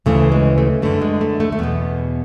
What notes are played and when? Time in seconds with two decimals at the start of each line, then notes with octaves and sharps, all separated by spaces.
0.06 D2 C#3 E3 A3
0.32 G#3
0.58 A3
0.82 F#2 D3 A3
1.02 G#3
1.21 A3
1.40 A3
1.52 A3
1.59 E2 B2 B3